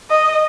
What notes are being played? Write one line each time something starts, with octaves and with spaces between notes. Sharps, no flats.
D#5